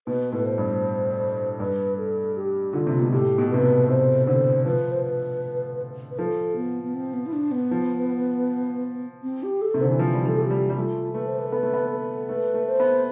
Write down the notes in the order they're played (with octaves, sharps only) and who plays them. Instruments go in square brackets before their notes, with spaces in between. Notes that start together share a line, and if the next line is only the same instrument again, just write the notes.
[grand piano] B2 [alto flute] B4
[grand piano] A2 [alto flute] B4
[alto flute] C5
[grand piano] G2
[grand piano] G2 [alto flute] B4
[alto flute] A4
G4
[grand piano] D3 [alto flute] F4
[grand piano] C3
B2
[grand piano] A2 [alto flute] G4
[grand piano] B2
[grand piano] C3 [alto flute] B4
[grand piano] B2
[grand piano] C3 [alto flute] C5
[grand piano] D3 [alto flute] C5
[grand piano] F3 [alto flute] B4
[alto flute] C5
B4
B4
[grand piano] F3 [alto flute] A4
[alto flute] B3
B3
C4
B3
E4
D4
B3
[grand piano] F3
[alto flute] C4
G4
A4
[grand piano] C3
[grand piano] D3 [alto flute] C5
[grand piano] E3
F3
G3
[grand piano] F3 [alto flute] A4
[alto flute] G4
[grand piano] G3
G3
[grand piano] A3 [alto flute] F4
[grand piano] A3 [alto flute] B4
[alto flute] C5
B4
A4
[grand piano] B3 [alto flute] B4
[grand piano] A3
B3
[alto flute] A4
[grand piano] A3 [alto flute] B4
[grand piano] A3
[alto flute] C5
[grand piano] B3